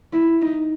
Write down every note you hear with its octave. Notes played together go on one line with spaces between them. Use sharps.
E4
D#4